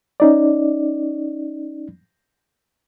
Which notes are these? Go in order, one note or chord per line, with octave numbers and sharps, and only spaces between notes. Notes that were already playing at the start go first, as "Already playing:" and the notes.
C#4 D#4 D5